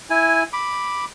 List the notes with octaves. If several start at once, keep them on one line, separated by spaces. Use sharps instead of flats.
E4 G#5
B5 D6